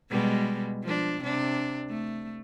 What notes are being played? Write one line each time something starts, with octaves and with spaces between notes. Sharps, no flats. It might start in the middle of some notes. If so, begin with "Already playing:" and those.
B2 G3 G#3
F3 D4
C3 D4
A3